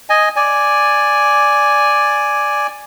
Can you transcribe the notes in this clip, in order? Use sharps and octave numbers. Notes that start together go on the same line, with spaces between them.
D#5 G#5
D5 G#5